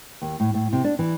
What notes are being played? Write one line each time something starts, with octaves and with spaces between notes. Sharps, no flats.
D#2
A2
A2
C3
D4
E3